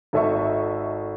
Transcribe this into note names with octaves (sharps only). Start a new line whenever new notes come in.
G#1 A4 D#5 E5 C#6